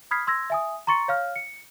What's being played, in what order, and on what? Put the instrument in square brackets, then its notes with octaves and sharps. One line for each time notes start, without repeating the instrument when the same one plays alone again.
[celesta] B5 D#6 F6 G#6 B6 C7
C6 E6 G#6 A#6
E5 G#5 D#6
A#5 C6 C#6 A6 C#7
C#5 F5 F6
C#7